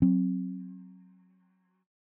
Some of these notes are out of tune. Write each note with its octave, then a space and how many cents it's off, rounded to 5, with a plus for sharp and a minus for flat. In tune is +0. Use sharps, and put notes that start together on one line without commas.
F#3 +0 C4 +25